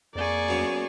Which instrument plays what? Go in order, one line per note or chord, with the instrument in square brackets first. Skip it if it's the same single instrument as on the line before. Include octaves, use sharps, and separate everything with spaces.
[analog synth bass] F2 [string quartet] A#3 G#4 C#6 [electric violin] D5
[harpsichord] F#2 B3